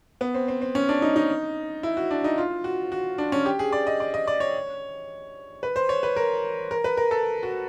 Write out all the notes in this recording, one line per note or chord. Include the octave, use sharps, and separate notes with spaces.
B3
C4
C4
C4
C#4
D4
D#4
D#4
E4
F#4
D4
D#4
F4
F#4
F#4
D4
C#4
G4
G#4
D5
D#5
D5
D#5
D5
C#5
B4
C5
C#5
B4
A#4
A#4
B4
A#4
A4
F#4